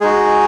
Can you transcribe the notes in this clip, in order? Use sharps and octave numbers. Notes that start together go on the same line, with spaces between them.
G#3 D#4 F#4 G#4